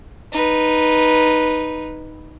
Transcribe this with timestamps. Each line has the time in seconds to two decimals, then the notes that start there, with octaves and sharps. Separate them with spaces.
0.32 D#4 B4